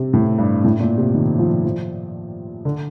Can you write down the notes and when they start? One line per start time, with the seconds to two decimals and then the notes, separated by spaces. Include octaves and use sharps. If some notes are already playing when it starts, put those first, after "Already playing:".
Already playing: C3
0.13 A2
0.38 G2
0.65 A2
0.80 A#2
0.98 C3
1.15 D#3
1.39 F3
1.64 F3
2.65 D3